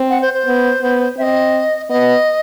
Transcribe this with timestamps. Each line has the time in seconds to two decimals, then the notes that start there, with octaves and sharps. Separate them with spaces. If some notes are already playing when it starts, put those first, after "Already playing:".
Already playing: C4
0.10 F#5
0.22 C5
0.34 C5
0.46 B3
0.82 B3
1.17 C4 E5
1.22 D#5
1.89 B3 D#5